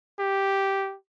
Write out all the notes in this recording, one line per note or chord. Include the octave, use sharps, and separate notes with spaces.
G4